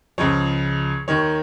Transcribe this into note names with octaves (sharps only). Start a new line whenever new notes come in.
C#2 C#3 F3 C#5
D#2 D#3 C#5